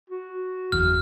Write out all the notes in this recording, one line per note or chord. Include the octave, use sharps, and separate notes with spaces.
F#4
F#1 E2 F6